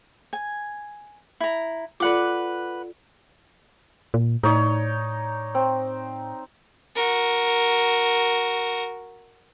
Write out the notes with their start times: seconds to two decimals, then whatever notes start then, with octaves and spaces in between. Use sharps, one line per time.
0.33 G#5
1.41 E4 A#5
2.00 F4 A4 B4 D5 F#5 D6
4.14 A#2
4.43 A2 D#4 C#5 D5
5.55 C4
6.95 F#4 A#4